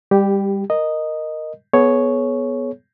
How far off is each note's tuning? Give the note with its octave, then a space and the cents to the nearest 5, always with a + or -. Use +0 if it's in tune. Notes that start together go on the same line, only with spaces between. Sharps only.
G3 +25 G4 +0
A#4 +0 D#5 -5
B3 +0 G#4 +40 C#5 +0